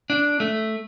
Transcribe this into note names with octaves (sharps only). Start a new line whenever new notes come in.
D4
A3